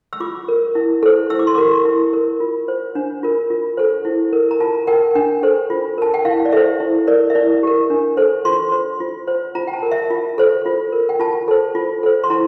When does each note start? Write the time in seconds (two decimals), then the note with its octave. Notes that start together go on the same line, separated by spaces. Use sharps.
0.13 E6
0.20 F4 D6
0.48 A#4
0.75 E4
1.03 A4 C5
1.30 E4 E6
1.39 D6
1.47 C6
1.55 G4 A#4 D6
1.85 E4
2.13 A#4
2.40 F4
2.68 C5
2.95 D4
3.23 F4 A#4
3.50 F4
3.77 A4 C5
4.05 E4
4.33 A#4
4.51 A#5
4.60 F4 A5
4.87 A#4 G5
5.15 D4 G5
5.43 A4 C5
5.70 F4
5.98 A#4 A5
6.14 G5
6.25 E4 F5
6.45 D5
6.52 A4 C5 E5
6.80 E4
7.07 A#4 D5
7.30 E5
7.35 E4 D5
7.63 G4 A#4
7.90 D4
8.17 A4 C5
8.45 F4 C6
8.72 C5
9.00 F4
9.28 C5
9.55 F4 A#5
9.67 G5
9.73 A5
9.83 A#4
9.92 E5
10.10 F4
10.38 A4 C5
10.66 F4
10.92 A#4
11.09 G5
11.20 F4 A5
11.48 A4 C5
11.75 F4
12.03 A4 C5
12.24 C6
12.30 E4 A#5